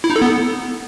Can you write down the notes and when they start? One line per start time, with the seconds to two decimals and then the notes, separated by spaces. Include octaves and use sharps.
0.04 E4
0.10 D#4
0.16 A4
0.22 B3